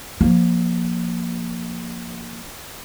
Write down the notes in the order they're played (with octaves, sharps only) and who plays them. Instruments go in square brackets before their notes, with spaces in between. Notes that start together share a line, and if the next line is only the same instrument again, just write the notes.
[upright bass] F3 A#3